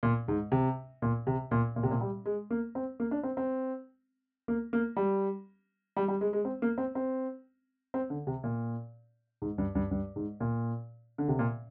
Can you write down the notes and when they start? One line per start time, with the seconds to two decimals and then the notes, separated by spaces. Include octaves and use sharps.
0.03 A#2
0.28 G#2
0.52 C3
1.02 A#2
1.27 C3
1.51 A#2
1.76 A#2
1.83 C3
1.91 A#2
2.01 G3
2.26 G#3
2.51 A#3
2.75 C4
3.00 A#3
3.11 D4
3.23 C4
3.37 C4
4.48 A#3
4.73 A#3
4.96 G3
5.96 G3
6.08 G3
6.21 G#3
6.33 G#3
6.45 C4
6.62 A#3
6.78 C4
6.95 C4
7.94 C4
8.10 D3
8.27 C3
8.44 A#2
9.42 G#2
9.58 G2
9.75 G2
9.91 G2
10.16 G#2
10.40 A#2
11.18 D3
11.28 C3
11.39 A#2